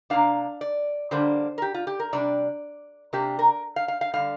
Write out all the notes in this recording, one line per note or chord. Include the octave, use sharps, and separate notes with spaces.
C3 A#3 D4 F5
D5
D3 G3 A#3 D4 C5
A#4
G4
F4
G4
A#4
C3 G3 D4 D5
C3 A#3 D4 G4
A#4
F5
F5
F5
D3 G3 F5